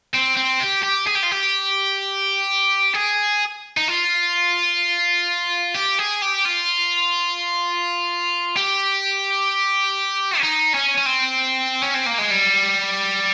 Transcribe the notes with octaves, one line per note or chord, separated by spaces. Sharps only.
C4
C4
G4
G4
G#4
G4
F4
G4
G#4
D#4
F4
G4
G#4
G4
F4
G4
C#4
D#4
C#4
C#4
C4
C#4
C4
A#3
G#3
G3